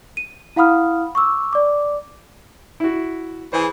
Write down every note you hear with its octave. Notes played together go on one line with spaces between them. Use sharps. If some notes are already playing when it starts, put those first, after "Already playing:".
D#7
E4 F5 F#5 B5 D#6 F6
C#6 D6 E6
D5 D6
E4 F#4
E3 G#4 C5